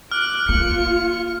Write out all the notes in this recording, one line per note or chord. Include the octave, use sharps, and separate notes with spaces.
D6 F6 F#6
A#3 F4 C#7